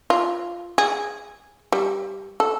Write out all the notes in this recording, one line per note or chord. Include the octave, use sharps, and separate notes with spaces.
F4
G#4
G3
A4